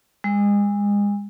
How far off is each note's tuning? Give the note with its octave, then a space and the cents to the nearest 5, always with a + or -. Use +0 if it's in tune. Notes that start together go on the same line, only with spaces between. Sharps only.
G#3 -30